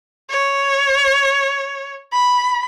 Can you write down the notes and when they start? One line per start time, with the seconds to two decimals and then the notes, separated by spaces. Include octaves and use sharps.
0.30 C#5
2.13 B5